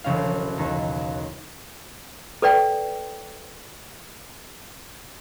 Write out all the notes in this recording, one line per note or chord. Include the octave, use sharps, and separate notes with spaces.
E1 B1 C#3 C#4 F5
D#2 D#3
A4 B4 D5 G5